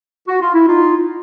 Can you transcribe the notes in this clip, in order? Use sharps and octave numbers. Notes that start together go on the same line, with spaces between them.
F#4
F4
E4
D#4 F4